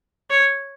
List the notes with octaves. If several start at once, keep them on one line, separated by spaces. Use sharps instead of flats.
C#5